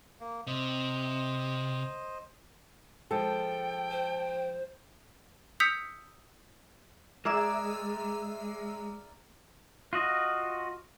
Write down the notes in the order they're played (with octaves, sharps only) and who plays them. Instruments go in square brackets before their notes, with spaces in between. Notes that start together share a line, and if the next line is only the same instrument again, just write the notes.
[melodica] A#3
[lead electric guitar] C3 [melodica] C5 D#5
[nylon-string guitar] F3 G#3 [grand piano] A4 [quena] G5
[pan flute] C5
[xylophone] D#6 E6 G6 B6 C#7 F7
[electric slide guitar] G#3 [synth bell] G#4 E5 E6 [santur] A#4 D5 D6
[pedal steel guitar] F4 F#4 D#5